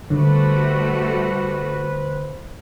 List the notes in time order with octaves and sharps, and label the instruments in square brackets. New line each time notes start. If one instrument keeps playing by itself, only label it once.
[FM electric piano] D3 [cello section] G3 A3 F#4 [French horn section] B4 C5